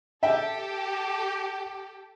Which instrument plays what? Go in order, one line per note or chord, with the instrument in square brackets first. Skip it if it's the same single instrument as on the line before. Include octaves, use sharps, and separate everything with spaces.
[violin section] G4 A4 [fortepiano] E5 G5